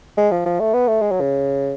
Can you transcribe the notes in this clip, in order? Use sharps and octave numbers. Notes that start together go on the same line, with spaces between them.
G#3
F3
F3
A3
B3
A3
G#3
F#3
C#3